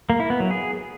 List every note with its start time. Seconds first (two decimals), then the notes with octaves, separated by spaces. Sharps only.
0.10 A#3
0.20 E4
0.30 B3
0.40 F#3
0.51 G#4